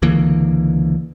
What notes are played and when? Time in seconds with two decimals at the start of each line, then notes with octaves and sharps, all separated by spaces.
0.02 C#2 D3 E3 A#3